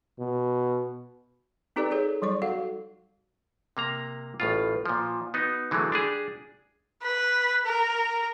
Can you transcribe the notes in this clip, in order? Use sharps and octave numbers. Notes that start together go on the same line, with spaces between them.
B2
C4 D#4 G4 A4 B4 D5
D#4 G#4 A4 C#5
F#3 G3 D5 C#6
F#4 A4 F5 F#5
C3 A#3 A#5
A1 A2 F4
A#2 F3
B3 D#4 F#4
D3 E3 F#3 G#3 A3
D4 G4 G#4
B4
A#4